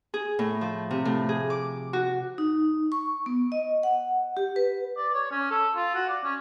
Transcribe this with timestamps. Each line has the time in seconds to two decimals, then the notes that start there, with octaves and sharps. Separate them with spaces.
0.14 G#4
0.39 A2
0.61 F3
0.91 C3
1.05 A2
1.29 G#4
1.50 D6
1.93 F#4
2.38 D#4
2.92 C#6
3.26 B3
3.52 D#5
3.83 F#5
4.37 G4
4.56 B4
4.97 D5
5.14 C#5
5.31 C#4
5.51 A4
5.76 F4
5.95 F#4
6.09 D5
6.24 C#4